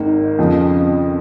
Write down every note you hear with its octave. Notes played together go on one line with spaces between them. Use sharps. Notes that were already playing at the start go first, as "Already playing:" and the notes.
Already playing: G#1 G#2 D#3 A#3
F2 C#3 F3